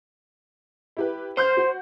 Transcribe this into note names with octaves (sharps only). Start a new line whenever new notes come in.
E4 G4 B4
C5 C6 F6 G6
F#4